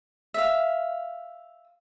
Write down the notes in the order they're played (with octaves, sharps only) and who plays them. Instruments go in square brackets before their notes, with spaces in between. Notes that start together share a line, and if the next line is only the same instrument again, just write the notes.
[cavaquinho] E5 F5